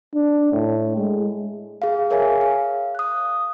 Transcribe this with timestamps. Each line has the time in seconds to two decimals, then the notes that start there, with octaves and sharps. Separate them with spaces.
0.14 D4
0.52 A2
0.97 G#3
1.82 G#4 F5
2.10 G#4 A#4 C#5 E5 F5 G#5
2.41 F5
2.95 D#6 F#6